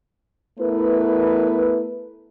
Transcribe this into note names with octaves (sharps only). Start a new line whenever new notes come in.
A3 B3 E4 A#4 B4